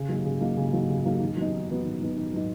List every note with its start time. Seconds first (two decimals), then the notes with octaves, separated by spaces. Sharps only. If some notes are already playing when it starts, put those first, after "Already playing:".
Already playing: C#3
0.09 F#3 A#3 D#4
0.25 C#3
0.41 F#3 A#3 D#4
0.57 C#3
0.73 F#3 A#3 D#4
0.89 C#3
1.05 F#3 A#3 D#4
1.20 D#3
1.37 F#3 B3 D#4
1.53 D#3
1.69 F#3 B3 D#4
1.85 D#3
2.01 F#3 B3 D#4
2.17 D#3
2.33 F#3 B3 D#4